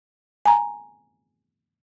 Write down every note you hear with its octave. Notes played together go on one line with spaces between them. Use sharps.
G#5 A#5